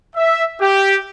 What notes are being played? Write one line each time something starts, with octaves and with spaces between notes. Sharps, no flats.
E5
G4